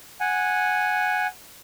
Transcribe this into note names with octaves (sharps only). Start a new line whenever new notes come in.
F#5 G#5